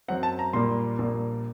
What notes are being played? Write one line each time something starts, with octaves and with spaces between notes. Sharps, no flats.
F#2 F#3 C4 F#5
A5
A#5
A#1 A#2 G3 A#3 C6
A#1 A#2 G3 A#3